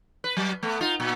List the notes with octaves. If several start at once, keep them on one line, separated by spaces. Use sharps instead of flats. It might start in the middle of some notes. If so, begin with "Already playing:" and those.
B4
F#3
A3 B3
D#4 F4
A#2